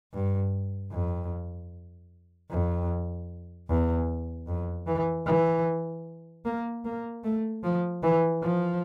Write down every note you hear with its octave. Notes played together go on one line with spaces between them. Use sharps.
G2
F2
F2
E2
F2
E3
E3
A#3
A#3
A3
F3
E3
F3